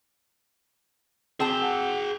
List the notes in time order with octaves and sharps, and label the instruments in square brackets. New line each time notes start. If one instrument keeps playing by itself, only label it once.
[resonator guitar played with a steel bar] C4 A5 [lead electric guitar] G#4 G5
[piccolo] F#5